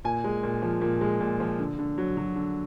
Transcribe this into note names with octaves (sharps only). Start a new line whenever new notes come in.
A#2 G#5
G#3
A#2
F3
A#2
G#3
A#2
F3
D3
D3
F#3
F#3
D3